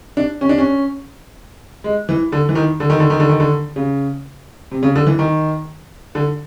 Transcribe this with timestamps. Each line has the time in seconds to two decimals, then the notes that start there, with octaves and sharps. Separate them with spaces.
0.17 D4
0.41 C#4
0.49 D4
0.58 C#4
1.84 G#3
2.09 E3
2.32 D3
2.49 E3
2.55 D#3
2.80 D3
2.90 D#3
3.00 D3
3.10 D#3
3.20 D3
3.29 D#3
3.40 D3
3.76 C#3
4.71 C3
4.83 C#3
4.95 D3
5.07 E3
5.19 D#3
6.15 D3